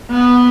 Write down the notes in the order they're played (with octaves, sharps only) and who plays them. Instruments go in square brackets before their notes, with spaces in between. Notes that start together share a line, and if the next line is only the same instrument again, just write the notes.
[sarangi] B3